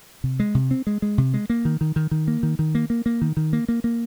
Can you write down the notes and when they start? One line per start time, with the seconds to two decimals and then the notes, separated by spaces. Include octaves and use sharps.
0.24 C3
0.40 G#3
0.55 C3
0.71 C4
0.87 G#3
1.02 G#3
1.18 C3
1.34 G#3
1.50 A#3
1.65 D#3
1.81 D#3
1.96 D#3
2.11 D#3
2.28 A#3
2.43 D#3
2.59 D#3
2.75 A#3
2.90 A#3
3.06 A#3
3.22 D#3
3.37 D#3
3.53 A#3
3.69 A#3
3.84 A#3